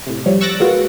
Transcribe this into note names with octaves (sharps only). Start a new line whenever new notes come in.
A2 C3
F3 G3 C#5
C#6 E6 F#6 A6 A#6 D7
G#3 A#3 B3 F4 F#4